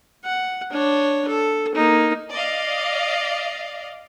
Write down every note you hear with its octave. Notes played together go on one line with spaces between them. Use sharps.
F#5
D4 C#5
A4
A#3 D#4
D5 D#5 F5